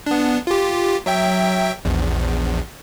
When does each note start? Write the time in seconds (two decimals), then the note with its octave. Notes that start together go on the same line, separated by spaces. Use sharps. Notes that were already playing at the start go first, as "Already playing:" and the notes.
0.06 B3 D4
0.47 F4 G4
1.06 F#3 E5 G5
1.85 A#1 E2